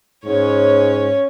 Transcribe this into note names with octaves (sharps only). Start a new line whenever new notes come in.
G#2 C#4 C#5